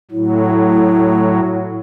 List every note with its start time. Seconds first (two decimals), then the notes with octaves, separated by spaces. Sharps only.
0.11 A2 F#3 E4